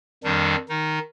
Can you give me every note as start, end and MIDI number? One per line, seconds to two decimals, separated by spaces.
0.24 0.56 41
0.24 0.56 51
0.24 0.56 55
0.24 0.56 62
0.69 0.99 51
0.69 0.99 63